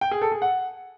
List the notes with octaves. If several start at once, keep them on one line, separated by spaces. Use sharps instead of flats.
G5
G#4
A4
G#4
F#5